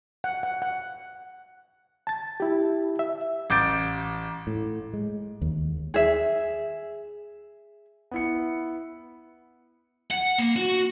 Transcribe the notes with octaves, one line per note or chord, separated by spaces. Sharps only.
F#5
F#5
F#5
A5 A6
E4 G4
E5
A1 D6 G6 A6 D7
A2
G#3
D#2
G#4 E5
B3 E4 C#7
F#5
A#3
F#4